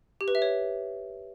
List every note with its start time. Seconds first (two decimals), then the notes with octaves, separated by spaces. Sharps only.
0.21 G4
0.28 B4
0.35 E5
0.42 C#5